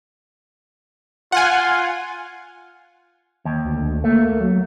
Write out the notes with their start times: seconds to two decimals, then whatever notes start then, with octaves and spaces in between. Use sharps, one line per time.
1.32 F4 F#5 G#5
3.45 D#2
3.65 D2
3.81 D2
4.04 A3 A#3
4.40 F#3